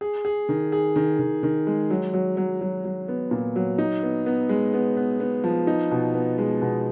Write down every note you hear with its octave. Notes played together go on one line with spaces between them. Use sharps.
G#4
G#4
D#3
G#4
D#3
D#3
D#3
G#3
F#3
F#3
F#3
F#3
F#3
B3
A#2
F#3
D#4
B3
B3
G#3
B3
B3
B3
F3
D#4
B2
B3
G#3
B2